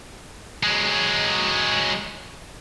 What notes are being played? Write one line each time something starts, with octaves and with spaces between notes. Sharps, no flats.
F#3 G#3